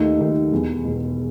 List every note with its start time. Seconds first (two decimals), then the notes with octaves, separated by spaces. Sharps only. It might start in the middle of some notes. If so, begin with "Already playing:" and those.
Already playing: D#2 D#3 A3 D#4
0.19 D#2 D#3 A3 D#4
0.51 E1 E2 B2
0.85 E1 E2 B2